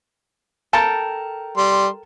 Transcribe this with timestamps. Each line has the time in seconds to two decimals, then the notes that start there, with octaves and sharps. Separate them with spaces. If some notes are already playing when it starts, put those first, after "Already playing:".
0.73 A4 A#4 G5 A5
1.57 G3 C6